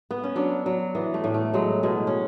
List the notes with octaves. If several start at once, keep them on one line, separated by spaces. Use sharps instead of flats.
B3
C#4
F#3 D4
F#3
E3 B3
A3
A2
A3
F#3 G#3
B2 G#3
C#4